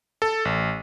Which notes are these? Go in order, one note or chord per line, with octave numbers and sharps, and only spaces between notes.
A4
A1